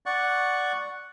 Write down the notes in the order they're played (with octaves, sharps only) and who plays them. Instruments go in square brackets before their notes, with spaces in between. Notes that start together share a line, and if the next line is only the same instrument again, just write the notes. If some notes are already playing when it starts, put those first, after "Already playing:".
[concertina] D5 F#5 C#6